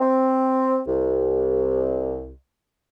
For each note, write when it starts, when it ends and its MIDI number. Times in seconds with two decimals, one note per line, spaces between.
0.01 0.80 60
0.87 2.32 36